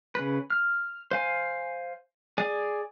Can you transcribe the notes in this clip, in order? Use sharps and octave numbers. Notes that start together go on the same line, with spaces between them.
C#3 B4
F6
C5 F5 G#5
G#4 D5 G#5